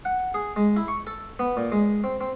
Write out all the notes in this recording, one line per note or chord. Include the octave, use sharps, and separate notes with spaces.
F#5
G#4
G#3
E4
C#6
A4
B3
A#2
G#3
C4
C4